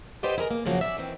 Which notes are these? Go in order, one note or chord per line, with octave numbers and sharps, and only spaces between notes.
G4 B4 C5 D5 D#5 F#5
E4 G#4 A#4 D#5
A#3
F#2 C#3 F3 F#3 A#3
C#4 D5 E5
D#3 E3 C4